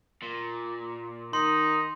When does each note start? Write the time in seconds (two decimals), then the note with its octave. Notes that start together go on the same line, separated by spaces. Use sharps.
0.22 A#2
1.33 D#3 D#4 C6